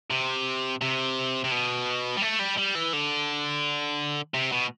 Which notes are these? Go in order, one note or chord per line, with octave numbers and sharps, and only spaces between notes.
C3
C3
C3
B2
G3
A3
G3
G3
E3
D3
C3
B2